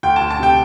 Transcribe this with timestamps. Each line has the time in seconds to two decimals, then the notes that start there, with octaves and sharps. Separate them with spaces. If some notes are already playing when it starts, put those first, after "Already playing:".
0.03 D2 G5
0.16 D2 A5
0.31 A5
0.39 C3 G5